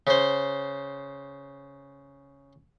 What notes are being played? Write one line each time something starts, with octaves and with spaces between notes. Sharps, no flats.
C#3 C5